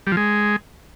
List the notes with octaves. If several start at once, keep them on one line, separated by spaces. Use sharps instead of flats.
G3
F3
G#3